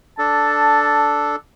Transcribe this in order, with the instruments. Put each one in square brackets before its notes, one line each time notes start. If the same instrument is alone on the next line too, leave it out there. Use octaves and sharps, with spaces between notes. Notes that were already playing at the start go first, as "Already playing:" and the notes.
[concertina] D4 A4 [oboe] A5